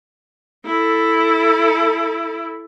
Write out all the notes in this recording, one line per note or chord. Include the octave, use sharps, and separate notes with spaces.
E4 A4